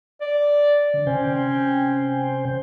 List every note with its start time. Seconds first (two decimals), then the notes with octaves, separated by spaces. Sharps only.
0.21 D5
0.94 D3
1.07 C3 C#4 C5 G5